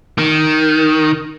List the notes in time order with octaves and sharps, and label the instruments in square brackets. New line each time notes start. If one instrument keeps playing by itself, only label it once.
[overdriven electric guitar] D#3